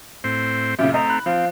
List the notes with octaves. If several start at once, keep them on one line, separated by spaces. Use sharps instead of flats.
A2 C4 C5
F#2 A#2 C#3 G4 E5
A3 C4 D#5 A#5
B5 F#6
F3 C4 F5